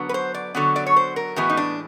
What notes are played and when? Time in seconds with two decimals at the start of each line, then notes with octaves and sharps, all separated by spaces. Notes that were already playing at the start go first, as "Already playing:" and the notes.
Already playing: D3 F#3 B3
0.09 B4
0.14 C5
0.34 D5
0.55 D3 F#3 B3
0.76 D5
0.86 C#5
0.96 C5
1.16 A#4
1.36 A2 E3 G#3 B3 F#4
1.49 D#4
1.57 D4